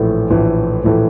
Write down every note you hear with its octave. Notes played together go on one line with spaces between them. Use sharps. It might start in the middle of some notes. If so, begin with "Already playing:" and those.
Already playing: A#1 A2 E3 A3
A#1 A2 E3 A3
A#1 A2 E3 A3